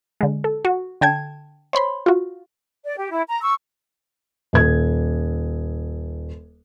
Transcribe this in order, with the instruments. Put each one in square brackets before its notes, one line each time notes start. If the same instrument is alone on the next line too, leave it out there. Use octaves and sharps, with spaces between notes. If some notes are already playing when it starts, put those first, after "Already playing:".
[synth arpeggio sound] D3 G#3
A4
F#4
D3 G5 A5 G#6
C5 C#5 B5 C6
F4 F#4
[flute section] D5
G4
E4
A#5
C#6 E6
[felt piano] D#1 G#6